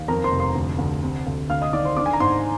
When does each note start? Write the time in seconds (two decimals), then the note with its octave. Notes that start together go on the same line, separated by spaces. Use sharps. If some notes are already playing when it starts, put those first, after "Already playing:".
Already playing: D#2
0.08 F2 A#4 A#5
0.24 C5 C6
0.32 F1
0.39 C5 C6
0.55 D2
0.78 D2
1.03 C3
1.26 D2
1.50 D2 F5 F6
1.61 D#5 D#6
1.73 D#3 D5 D6
1.85 C5 C6
1.96 D4 D5 D6
2.06 G#5
2.13 A#5
2.20 G#2 C5 C6